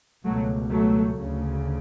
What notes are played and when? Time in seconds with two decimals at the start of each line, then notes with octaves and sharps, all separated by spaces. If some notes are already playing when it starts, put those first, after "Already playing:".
0.25 C#2 B2 F#3 A3
0.71 F#3 A3
1.18 D2 C#3